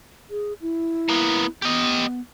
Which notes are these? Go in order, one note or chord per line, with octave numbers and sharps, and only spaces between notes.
G#4
E4
A#3 B3
B3 G4 D#5